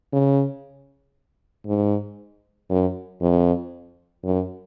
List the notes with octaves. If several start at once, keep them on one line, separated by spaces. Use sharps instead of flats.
C#3
G#2
F#2
F2
F#2